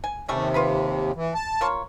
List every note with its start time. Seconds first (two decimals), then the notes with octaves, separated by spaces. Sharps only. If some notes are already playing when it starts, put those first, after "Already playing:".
0.04 G#5
0.28 D#2 C3 G3 A3 C#4
0.54 F4 B4 B5
1.15 E3
1.34 A5
1.61 A#3 F4 C#5